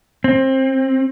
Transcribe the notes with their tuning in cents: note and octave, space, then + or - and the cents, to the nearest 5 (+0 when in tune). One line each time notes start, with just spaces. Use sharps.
C4 +25